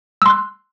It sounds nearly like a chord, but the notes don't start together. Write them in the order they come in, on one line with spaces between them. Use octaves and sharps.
E6 C6 F#6